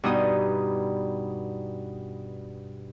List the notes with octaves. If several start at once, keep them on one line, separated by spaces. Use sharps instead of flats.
G2 B2 D#4 D#6